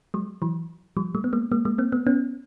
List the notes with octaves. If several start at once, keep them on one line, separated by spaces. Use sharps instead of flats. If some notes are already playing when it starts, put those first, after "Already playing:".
F#3 G#3
E3 F#3
F3 G3
G3 A3
B3
G#3 A#3
G#3 A#3
G#3 A#3
A#3 C4
A3 B3
B3 C#4